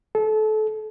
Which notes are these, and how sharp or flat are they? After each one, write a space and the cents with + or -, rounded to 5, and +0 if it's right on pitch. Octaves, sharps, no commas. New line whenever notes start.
A4 -30